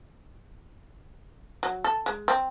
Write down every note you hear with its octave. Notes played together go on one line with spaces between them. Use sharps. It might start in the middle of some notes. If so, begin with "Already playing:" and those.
F#3
A4
G#3
C4